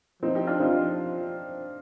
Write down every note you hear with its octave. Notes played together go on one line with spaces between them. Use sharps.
F3 C4 D#4
D#4 G4
D4 F4
C4 D#4
F3